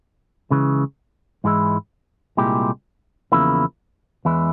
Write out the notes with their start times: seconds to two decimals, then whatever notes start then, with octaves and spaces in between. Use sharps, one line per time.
0.51 C#2 C#3 E3
1.44 G#2 E3 G#3 E4
2.37 C2 A#2 G#3 E4 G4
3.32 E2 C#3 F3 A#3 E4
4.25 E2 E3 G#3 E4